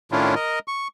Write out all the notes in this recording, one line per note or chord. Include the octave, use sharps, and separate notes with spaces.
A2 D#3 C#4 D4 E4 F4
A#4 D#5
C#6